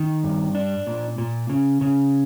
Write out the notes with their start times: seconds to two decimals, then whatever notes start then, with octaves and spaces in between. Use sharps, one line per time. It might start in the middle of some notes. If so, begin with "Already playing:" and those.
Already playing: D#3
0.24 G2
0.55 D4
0.87 A#2
1.18 A#2
1.50 C#3
1.81 C#3